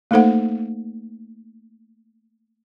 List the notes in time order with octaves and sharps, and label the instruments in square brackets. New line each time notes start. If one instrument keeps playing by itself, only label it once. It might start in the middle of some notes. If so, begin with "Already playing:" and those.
[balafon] A3 A#3 D#4 A4 C5 F#5